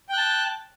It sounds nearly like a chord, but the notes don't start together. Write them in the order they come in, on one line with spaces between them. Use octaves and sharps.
G5 F#6 A5